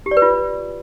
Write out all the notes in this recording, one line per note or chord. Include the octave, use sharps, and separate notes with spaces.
G4
D5
B4
F4